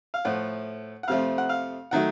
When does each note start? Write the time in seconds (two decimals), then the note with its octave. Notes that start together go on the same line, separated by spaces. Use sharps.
0.14 F5
0.25 A2 F3 A3 F#5
1.03 F#5
1.08 F2 C3 F3 A3 F5
1.38 F#5
1.49 F5
1.91 D#3 F#3 A3 F#5